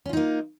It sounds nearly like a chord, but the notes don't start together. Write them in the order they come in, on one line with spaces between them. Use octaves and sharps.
C#4 F4 D#4 A#3